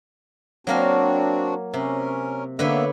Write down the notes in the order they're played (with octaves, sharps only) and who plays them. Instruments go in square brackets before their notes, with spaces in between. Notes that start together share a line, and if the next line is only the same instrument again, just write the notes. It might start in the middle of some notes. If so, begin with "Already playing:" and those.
[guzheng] F#3 A#3 A#4 [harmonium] C4 D4 F#4
[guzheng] C3 [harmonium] C#4 A#4
[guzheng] D3 B4 C#5 [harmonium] A#3 B3 E5